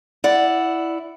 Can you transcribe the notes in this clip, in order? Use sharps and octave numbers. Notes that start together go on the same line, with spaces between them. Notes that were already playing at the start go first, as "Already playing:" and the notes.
E4 D5 F#5